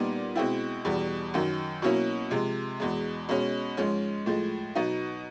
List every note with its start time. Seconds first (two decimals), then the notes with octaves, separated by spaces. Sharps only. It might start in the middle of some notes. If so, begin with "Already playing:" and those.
Already playing: A#2 G3 B3 D#4
0.36 B2 G#3 C4 E4
0.85 E2 B2 G3
1.34 F#2 D#3 F#3
1.82 B2 F#3 A#3 C#4 E4
2.31 C3 F3 G#3
2.80 E2 B2 G#3
3.29 B2 G#3 C#4
3.77 G#2 F3 G#3 C#4
4.26 A2 F3 G#3
4.75 B2 F#3 B3 D#4